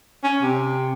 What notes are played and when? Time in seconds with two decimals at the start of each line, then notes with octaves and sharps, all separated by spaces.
0.23 C#4
0.42 C3